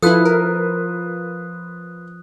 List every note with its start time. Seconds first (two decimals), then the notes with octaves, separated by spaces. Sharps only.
0.03 F3 E4 F4 A4 B4 D#6 F#6
0.25 A#4